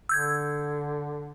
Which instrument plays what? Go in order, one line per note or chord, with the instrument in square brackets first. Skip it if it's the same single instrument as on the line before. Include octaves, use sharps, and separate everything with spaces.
[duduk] D3 [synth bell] E6 G6 G#6